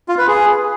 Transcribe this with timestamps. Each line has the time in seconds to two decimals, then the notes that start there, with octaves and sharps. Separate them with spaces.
0.09 F4
0.18 B4
0.28 G#4